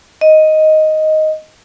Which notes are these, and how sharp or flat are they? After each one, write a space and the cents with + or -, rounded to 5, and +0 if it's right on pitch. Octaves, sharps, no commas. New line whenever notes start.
D#5 +5